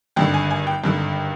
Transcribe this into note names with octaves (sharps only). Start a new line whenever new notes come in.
G#1 G2 D3 G5
G#5
G#5
G5
G#1 G2 D3